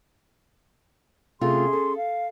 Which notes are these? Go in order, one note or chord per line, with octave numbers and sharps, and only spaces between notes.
C3 A3 C#4 F4 G#4 C6
A4
F5